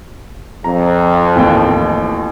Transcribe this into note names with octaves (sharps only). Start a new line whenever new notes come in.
F2 A#5
A1 D#2 G5